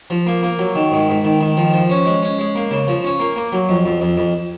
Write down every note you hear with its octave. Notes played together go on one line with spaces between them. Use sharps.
F3
A#3
A#3
F#3
D#3
G#2
G#2
D#3
D#3
F3
F3
C#4
G#3
C#4
G#3
A#3
C#3
F3
C#4
A#3
A#3
F#3
F2
F2
F2
F2